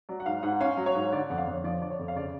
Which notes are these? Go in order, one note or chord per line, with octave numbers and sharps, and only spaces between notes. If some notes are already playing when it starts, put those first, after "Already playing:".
F#3 D5
F#5
G#2 F5
G#2 F#5
C#4 F5
F#3
C#5
G#2
D3 D5
F2 F#5
F5
F2
C#5
F3 D5
D3 D5
C#5
F2
F5
C#3 D5